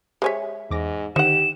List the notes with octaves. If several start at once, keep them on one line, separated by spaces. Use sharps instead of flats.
G#3 G4 C5 C#5 E5 G#5
E2 G#2 D6 A#6
D3 D#3 D#4 G4 C5 F#5 E7